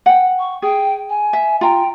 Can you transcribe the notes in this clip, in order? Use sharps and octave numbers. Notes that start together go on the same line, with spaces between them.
F#5 G5
C#6
G#4 G5
G#5
E5
F4 G5 A#5